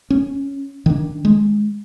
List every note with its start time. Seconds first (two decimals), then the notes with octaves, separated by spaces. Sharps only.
0.10 C#4
0.86 D#3 D4
1.25 G#3